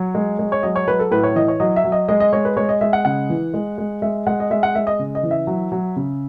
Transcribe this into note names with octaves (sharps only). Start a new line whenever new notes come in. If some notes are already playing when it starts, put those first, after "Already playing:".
Already playing: F#3 C#5
G#3
G#3
C#5
F#3 D#5
C#5
F#3 B4
A4
A2 B4
C#5
E3 D#5
C#5
F#3 D#5
E5
F#3
D#5
G#3 D#5
D#5
G#3 C#5
B4
G#3 C#5
D#5
G#3 E5
F#5
C#3 F#5
E3
G#3
G#3
G#3 E5
G#3 F#5
D#5
G#3 E5
F#5
G#3 E5
D#5
C#3
D#5
E3
E5
F#3
F#3
C#3